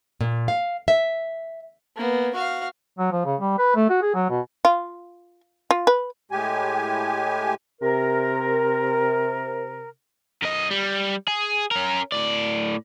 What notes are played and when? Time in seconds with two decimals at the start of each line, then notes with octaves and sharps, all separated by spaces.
0.21 A#2
0.48 F5
0.88 E5
1.97 A#3 B3
2.35 F#4 F5
2.99 F#3
3.12 F3
3.25 C#3
3.40 G3
3.58 B4
3.76 A3
3.90 F#4
4.02 G#4
4.14 F#3
4.30 B2
4.65 F4
5.71 F4
5.87 B4
6.31 A2 G#3 G4 G#5
7.81 C3 A#4
10.42 F#2 D#5
10.71 G3
11.28 G#4
11.71 C#4 A#4
12.12 A2 D5